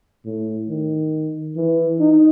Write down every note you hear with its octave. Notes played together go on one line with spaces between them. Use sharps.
A2
D#3
E3
D#4